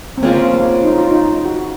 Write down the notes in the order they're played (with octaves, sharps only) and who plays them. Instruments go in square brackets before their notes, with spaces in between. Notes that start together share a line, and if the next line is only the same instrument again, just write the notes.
[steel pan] C4
[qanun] C#3 F3 G#3 C#4 [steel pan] A#3
[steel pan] A#3
D#4
F4
D#4
F#4